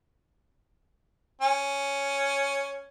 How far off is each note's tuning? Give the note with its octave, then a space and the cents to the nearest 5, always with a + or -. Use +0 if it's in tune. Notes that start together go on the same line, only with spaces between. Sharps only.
C#4 +5